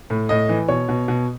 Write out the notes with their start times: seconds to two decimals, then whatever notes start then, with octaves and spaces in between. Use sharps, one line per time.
0.10 A2
0.29 A2 D#5
0.49 E3
0.68 B2 C#5
0.89 B2
1.08 B2